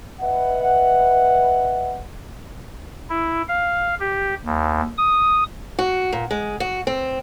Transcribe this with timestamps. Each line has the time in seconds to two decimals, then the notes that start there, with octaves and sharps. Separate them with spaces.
0.21 B4 D#5 E5 F#5
3.09 E4
3.48 F5
4.00 G4
4.45 D#2
4.97 D#6
5.79 F#4
6.13 A#2
6.31 G#3
6.60 F#4
6.87 C4